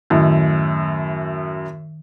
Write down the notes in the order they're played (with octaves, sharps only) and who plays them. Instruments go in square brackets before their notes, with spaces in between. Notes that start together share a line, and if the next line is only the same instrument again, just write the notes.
[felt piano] F#2 A2 [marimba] D#3